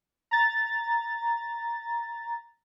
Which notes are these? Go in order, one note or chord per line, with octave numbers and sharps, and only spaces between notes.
A#5 A6